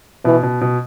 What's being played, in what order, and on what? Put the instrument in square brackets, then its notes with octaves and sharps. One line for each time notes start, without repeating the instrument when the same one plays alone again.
[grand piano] B2 [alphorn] E3
[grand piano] B2
B2